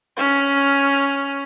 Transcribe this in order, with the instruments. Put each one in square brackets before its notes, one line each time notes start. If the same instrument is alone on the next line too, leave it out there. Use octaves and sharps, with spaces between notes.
[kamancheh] C#4 F6